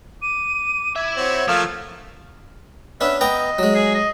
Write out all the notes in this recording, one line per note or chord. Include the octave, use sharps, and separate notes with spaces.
D6 D#7
E4 E5 G#6
C4 F#4 C#5
F3 A3 A#3 F5 F6
B3 C#4 D4 E5
B3 D#5 G5 A#5
F#3 G#3
G#4
D#5